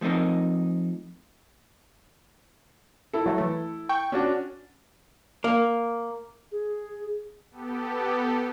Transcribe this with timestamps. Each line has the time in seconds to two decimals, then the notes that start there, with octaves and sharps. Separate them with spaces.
0.01 F3 A3 C4 D#4 A#4
3.13 E4 A4
3.26 F#3 A3
3.38 E3 A3
3.89 G5 C#6
4.12 C#4 D4 F#4
5.44 A#3
6.52 G#4
7.50 B3 G4 A4